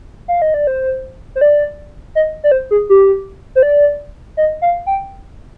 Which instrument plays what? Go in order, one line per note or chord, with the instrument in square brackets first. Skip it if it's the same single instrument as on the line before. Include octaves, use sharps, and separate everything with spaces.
[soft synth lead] F5
D#5
D5
C5
C5
D5
D#5
D5
C5
G#4
G4
C5
D5
D#5
F5
G5